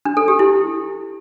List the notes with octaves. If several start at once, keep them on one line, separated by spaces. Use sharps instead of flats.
D4
A4
G4
E4